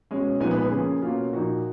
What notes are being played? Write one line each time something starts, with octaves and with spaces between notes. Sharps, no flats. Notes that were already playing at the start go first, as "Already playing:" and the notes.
B2 G#3 C#4
A#2 F3 G#3 B3 D#4 G#5
B4
B4
C#3 F3 A#3 G#4
B2 A#3 C#4 F4
A#2 F3 A#3 D#4 F#4